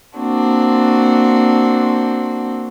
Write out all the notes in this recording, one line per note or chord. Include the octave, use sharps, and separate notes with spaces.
A#3 C4 D4 F#4